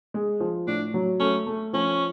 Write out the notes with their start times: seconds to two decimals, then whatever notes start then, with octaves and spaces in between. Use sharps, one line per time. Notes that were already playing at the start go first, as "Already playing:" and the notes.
0.14 G#3
0.40 F3
0.67 A2 D4
0.94 F#3
1.19 A3 C#4
1.46 A3
1.73 F3 C#4